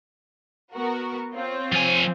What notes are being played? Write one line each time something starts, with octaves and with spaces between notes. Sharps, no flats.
B3 F#4 A#4
C4 F4 C#5
F3 G#5